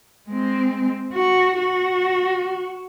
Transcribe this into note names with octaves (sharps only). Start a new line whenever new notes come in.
G#3 C4
F#4
F#4